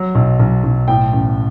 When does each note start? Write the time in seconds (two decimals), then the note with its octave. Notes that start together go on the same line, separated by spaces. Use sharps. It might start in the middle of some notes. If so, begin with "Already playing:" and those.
Already playing: F#3
0.15 B1
0.39 B1
0.64 B1
0.88 A2 G5
1.13 A1